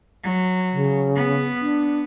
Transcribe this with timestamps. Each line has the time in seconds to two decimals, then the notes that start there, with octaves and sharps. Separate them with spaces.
0.24 F#3
0.72 C#3
1.16 B3
1.61 D4